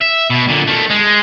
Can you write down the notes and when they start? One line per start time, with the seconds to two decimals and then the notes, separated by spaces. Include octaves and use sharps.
0.01 E5
0.30 B2
0.49 A#2 D3
0.67 D#3 A3
0.90 G#3